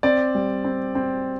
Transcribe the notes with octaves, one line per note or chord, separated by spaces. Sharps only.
C4 D5
G3
C4
C4